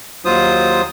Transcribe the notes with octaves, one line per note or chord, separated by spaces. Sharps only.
D#2 F#3 F4 C5 D#6